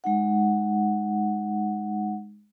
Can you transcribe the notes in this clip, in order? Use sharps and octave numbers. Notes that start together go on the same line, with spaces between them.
G#3 D#4 F#5